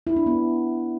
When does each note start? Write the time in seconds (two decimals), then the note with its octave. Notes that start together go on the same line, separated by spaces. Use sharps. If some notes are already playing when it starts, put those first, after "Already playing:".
0.07 E4
0.16 D4
0.26 B3